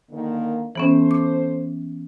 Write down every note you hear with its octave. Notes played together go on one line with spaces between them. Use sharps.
D3 D#3 A#3
E3 B3 C#4 A4 C5
D6